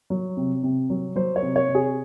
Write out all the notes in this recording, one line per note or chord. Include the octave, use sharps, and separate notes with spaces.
F#3
C3
C3
F#3
F#3 C5
C#5
C3
C#5
C3
G#4